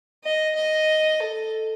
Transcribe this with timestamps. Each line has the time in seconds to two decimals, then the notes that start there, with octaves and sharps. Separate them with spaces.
0.24 D#5
0.56 D#5
1.21 A4